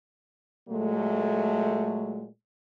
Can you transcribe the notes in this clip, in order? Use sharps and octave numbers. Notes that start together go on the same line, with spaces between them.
A#2 F#3 G#3 A3